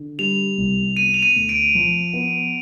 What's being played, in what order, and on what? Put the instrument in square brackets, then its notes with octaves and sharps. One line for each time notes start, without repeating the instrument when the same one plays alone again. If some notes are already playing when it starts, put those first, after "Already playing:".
Already playing: [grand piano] D3
[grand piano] G3 [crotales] F7
[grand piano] C2
[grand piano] B3 [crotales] D#7
[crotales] F7
D#7
[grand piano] D2
[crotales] D7
[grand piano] F3
B3